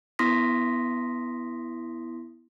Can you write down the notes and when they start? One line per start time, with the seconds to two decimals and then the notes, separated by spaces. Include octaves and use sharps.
0.19 B3 E4 C6 D#6 A#6 B6